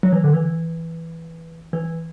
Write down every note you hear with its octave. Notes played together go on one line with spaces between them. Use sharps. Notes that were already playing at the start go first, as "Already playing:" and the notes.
F#3
E3
D3
E3
E3